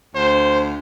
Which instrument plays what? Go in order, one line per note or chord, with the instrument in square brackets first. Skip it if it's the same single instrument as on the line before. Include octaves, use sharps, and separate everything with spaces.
[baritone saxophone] D2 [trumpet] C5